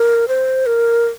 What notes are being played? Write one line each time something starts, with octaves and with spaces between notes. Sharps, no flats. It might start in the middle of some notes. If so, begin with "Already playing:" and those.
Already playing: A#4
C5
A#4